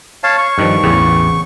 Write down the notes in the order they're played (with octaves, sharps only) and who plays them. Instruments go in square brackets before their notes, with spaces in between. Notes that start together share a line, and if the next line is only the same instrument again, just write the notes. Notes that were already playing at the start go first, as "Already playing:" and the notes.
[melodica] C#5 F5 A5
C#6
[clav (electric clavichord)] G2 D#3 F3
A1 E2 C#3